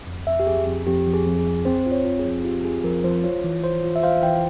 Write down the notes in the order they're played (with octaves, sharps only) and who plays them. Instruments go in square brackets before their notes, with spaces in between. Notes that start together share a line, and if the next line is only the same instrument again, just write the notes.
[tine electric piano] F2
[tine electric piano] F2 [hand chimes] E5
[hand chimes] G4
[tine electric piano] F2 [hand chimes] G#4
[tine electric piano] F2
[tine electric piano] F2 [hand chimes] G4
[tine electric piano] F3
[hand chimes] G#4
[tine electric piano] F2
[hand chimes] G#4
[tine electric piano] F2
[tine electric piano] C4 [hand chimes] C5
[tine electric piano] F4
[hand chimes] C#5
[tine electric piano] F4
[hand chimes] G#4
[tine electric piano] F3
[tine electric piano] F4 [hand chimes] G4
[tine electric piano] F4 [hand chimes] G#4
[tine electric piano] F3 [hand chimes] A#4
[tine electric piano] F3 [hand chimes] C5
[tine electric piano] F4 [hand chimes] C#5
[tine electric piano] E3
C5
F4
[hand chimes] E5
[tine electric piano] C5 [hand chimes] F5
[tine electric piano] E3 [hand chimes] G5